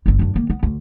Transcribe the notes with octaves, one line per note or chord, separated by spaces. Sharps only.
G1 C4
F#2 D4
D#3 A#3
B3
D2